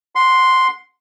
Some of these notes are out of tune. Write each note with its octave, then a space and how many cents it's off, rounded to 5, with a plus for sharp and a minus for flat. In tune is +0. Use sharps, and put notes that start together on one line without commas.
F#5 -20 C6 +0